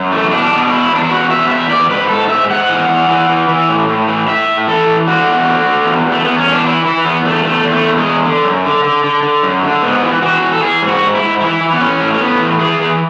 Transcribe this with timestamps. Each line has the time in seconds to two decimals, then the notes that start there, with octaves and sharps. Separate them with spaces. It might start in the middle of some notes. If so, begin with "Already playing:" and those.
Already playing: F#2
0.12 E3 A3
0.31 B2 D4
0.51 B2
0.66 D4
0.71 E2 E4
0.92 E2 D4
1.04 E4
1.11 E2 F#4
1.30 B2 E5
1.51 E2 E5
1.70 E2 D5
1.90 G#2 B4
2.09 G#2 A4
2.29 G#2 E5
2.50 G#2 F#5
2.69 E3
2.89 E3
3.08 E3
3.29 E3
3.49 E3
3.69 A2
3.89 A2
4.07 E3
4.27 A2 E5
4.48 A2
4.68 E3 A4
4.87 E3
5.07 D3 F#4
5.28 E2
5.47 D3
5.67 D3
5.86 E2
6.06 E2
6.12 A3
6.25 E2 B3
6.38 C#4
6.46 E2
6.52 D4
6.66 E3 E4
6.85 E3 E4
7.05 E2 B3
7.25 E2 A3
7.45 E2 A3
7.65 E2
7.72 A3
7.84 E2
7.97 G#3
8.04 E2
8.25 D3
8.44 F#2
8.64 D3
8.84 D3
9.04 D3
9.23 D3
9.43 F#2
9.63 D3
9.82 G#2 B3
10.03 E3
10.22 E3 F#4
10.42 E3
10.52 A4
10.62 E3 G#4
10.82 G#2
10.88 F#4
11.01 G#2
11.15 E4
11.22 G#2
11.41 E3 E4
11.61 E3
11.73 B3
11.80 E3 C#4
12.01 A2
12.14 C#4
12.20 A2 B3
12.40 E3
12.60 E3 G#4
12.79 E3